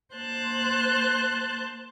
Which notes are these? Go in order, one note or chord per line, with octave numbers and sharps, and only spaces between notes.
A#3 C5 A5 F#6 G6